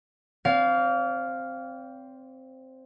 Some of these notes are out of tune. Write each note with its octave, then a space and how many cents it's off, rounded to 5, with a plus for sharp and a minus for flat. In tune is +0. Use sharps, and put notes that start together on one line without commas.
C4 +0 D5 -40 F5 +0